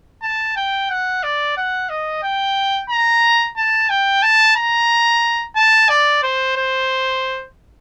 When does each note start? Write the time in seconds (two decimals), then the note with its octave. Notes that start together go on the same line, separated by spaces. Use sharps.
0.23 A5
0.56 G5
0.90 F#5
1.23 D5
1.57 F#5
1.89 D#5
2.23 G5
2.90 A#5
3.57 A5
3.90 G5
4.23 A5
4.56 A#5
5.56 A5
5.89 D5
6.23 C5
6.56 C5